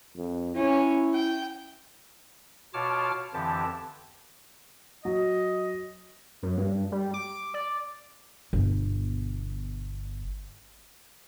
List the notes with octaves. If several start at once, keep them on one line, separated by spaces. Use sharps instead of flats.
F2
C#4 E4
G5
B2 F4 C#5 A5 D6 F6
F2 D3 E3 G4 A5
F#3 D#5
F#2
G2
G3
D6
D5
G1 B2